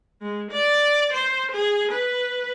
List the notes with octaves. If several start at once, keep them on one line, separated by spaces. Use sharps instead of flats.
G#3
D5
C5
G#4
B4